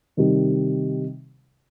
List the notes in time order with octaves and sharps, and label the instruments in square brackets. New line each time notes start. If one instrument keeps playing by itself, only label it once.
[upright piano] C3 D#3 G3